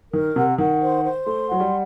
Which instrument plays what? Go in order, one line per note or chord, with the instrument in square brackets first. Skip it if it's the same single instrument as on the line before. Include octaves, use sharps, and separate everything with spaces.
[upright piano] D#3 [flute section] A#4
[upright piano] C3 [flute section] F#5
[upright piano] D#3 [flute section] F#5
[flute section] C5
C5
[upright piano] A3 [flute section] C6
[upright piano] F#3 [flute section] F#5
[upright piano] G3